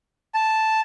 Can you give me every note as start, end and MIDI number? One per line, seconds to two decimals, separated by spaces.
0.34 0.80 81